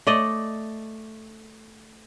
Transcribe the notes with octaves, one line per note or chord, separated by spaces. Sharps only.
A3 D5 D#5